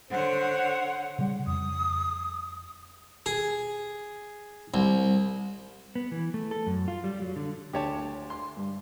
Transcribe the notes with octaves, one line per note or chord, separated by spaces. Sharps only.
D3 C5 C#5 F#5
C#3 G3
F2 D#6
G#4
C2
B3
E3
A3
A4
F#2
F4
G3
F#3
D3
D2 G4 C#5 A5
C6
G2